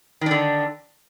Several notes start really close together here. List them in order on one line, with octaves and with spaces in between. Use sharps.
D#3 D4 D3